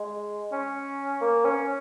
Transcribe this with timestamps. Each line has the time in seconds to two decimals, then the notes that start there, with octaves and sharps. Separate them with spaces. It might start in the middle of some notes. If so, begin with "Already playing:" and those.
Already playing: G#3
0.52 C#4
1.21 A#3
1.45 C#4